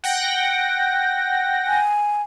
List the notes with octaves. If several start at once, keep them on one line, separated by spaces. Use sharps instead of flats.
F#5 G5 A#6
G#5